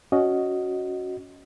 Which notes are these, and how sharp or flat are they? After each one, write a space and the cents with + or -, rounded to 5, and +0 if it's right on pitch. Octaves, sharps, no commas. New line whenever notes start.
C#4 +15 F#4 +0 D#5 +0